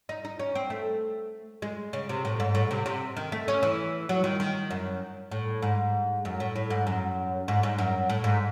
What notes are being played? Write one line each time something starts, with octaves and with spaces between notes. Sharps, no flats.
D#4
D#4
C#4
C4
A3
G#3
C#3
C3
A2
G#2
A2
C3
C3
D#3
A3
C#4
E3
F#3
D#3
D#3
F#2
A2
G#2
F#2
A2
A2
G#2
F#2
G#2
G#2
F#2
A2
G#2